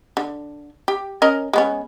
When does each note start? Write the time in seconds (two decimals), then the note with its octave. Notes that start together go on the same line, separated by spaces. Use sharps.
0.17 D3
0.88 G4
1.22 C#4 A#4 D#5
1.53 G#3 B3 C#4